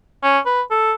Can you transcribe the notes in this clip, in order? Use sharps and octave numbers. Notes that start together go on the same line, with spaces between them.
C#4
B4
A4